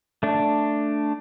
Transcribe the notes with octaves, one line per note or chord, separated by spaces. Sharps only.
A3 D4